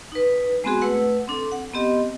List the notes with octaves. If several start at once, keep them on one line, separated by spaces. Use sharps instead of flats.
D#4 B4
G#3 B3 C4 F#4 G#4
A3 B4 F#5 E6
C4 D4 A4
F#5
B3 C4 G4 D#5